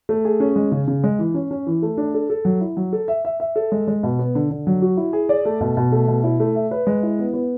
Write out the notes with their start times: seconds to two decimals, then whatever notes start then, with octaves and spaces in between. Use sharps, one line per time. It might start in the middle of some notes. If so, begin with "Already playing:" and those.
0.09 A3
0.25 G#4
0.40 C#4
0.56 G#3
0.72 C#3
0.88 C#3
1.04 G#3
1.19 E3
1.34 C#4
1.51 C#4
1.67 E3
1.82 A3
1.97 D4
2.14 A4
2.30 A4
2.45 F#3
2.61 E4
2.77 F#3
2.93 A4
3.08 E5
3.25 E5
3.40 E5
3.56 A4
3.72 G#3
3.87 G#3
4.03 B2
4.19 B3
4.35 D3
4.51 D3
4.67 F#3
4.82 F#4
4.97 E4
5.13 G#4
5.29 D5
5.45 A3
5.61 B2
5.77 B2
5.92 A3
6.08 B2
6.24 E4
6.40 A3
6.55 E5
6.71 B4
6.87 G#3
7.03 E4
7.19 B3
7.34 B3